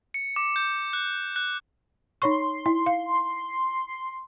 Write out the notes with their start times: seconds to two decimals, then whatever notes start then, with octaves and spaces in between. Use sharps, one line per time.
0.14 C#7
0.36 D6
0.56 G6
0.93 F#6
1.36 F#6
2.22 D#4 C#5 C6 C#6
2.66 E4
2.86 F5